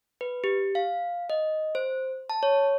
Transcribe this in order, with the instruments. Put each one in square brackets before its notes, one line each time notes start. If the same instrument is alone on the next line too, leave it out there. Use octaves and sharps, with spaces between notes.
[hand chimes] B4
G4
F5
D#5
C5
A5
C#5